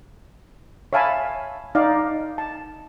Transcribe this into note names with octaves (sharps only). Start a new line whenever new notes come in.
C#5 E5 F5 G#5 A5 B5
D#4 D5 F5
A5